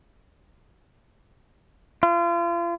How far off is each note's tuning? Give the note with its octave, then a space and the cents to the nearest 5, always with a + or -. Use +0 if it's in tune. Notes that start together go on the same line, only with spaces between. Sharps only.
F4 -35